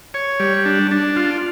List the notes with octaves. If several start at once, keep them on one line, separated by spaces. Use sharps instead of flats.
C#5
G3
D4
D4
F4